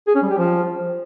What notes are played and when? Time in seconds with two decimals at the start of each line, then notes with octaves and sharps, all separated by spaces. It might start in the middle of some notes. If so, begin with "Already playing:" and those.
0.07 G#4
0.15 C#4
0.23 G3
0.30 G4
0.38 F3